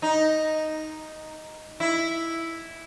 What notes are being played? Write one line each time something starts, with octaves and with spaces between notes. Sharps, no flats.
D#4
E4